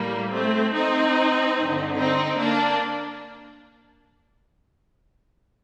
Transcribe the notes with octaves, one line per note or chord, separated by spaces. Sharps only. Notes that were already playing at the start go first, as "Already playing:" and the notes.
Already playing: A2 G3 A#3
A3 C4
C4 D#4
G2 D3
C4 D#4
A#3 D4